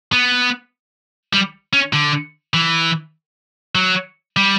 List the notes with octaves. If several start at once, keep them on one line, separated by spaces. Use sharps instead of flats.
B3
G3
C#4
D3
E3
F#3
G3